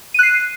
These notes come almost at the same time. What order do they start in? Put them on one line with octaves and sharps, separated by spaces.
D#7 F#6 C7